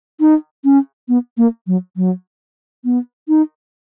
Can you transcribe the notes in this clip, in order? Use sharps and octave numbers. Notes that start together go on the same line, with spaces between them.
D#4
C#4
B3
A#3
F#3
F#3
B3
D#4